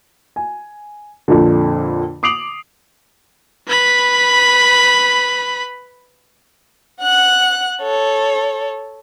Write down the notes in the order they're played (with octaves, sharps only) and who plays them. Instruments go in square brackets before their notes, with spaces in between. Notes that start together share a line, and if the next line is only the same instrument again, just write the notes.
[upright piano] G#5
F2 A#2 D3
D6 D#6 C7 D7 F7 F#7
[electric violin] B4 B5
[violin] F#5 F#6
A4 C#5